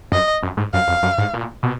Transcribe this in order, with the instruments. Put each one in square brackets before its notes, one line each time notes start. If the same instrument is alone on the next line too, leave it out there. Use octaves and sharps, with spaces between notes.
[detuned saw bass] F#2 [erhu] D#5
[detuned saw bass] F#2
G#2
[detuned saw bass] F#2 [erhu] F5
[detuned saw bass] F2
F#2
G#2
A#2
B2